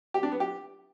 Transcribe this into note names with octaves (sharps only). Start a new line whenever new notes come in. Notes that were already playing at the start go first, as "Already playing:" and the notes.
G4
D4
B3
G4